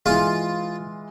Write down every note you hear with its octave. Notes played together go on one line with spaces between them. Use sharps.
E3 G#3 F4